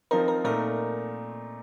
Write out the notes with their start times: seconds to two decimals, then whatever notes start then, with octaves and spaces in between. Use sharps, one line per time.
0.11 F3 C4 D#4 A#4
0.28 A#4
0.44 A#2 A3 D#4 A#4